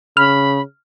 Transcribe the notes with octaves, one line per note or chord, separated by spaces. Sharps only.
C#3 B5 F6